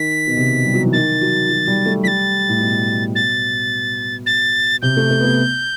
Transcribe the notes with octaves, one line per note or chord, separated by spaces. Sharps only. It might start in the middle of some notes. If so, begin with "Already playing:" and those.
Already playing: D#3 B6
B2
C3
G3
F#3
E3
D#3 A6
F#3
F#3
G3
A3
G3 A6 B6
A2
B2
A6
A6
C3 G6
A3
A3
B3
A3